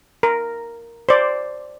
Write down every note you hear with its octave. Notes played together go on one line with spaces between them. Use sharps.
A#4
C5 D5